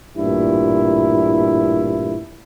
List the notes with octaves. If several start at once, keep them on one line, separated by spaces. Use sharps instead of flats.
A1 G2 A#2 E4